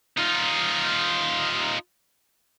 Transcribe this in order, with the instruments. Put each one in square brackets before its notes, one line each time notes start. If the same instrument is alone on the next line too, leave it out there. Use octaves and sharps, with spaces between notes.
[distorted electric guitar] D#4 F4